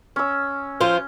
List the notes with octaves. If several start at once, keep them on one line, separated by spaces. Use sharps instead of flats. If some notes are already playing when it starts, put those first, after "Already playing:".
C#4 E6
F3 F4 C5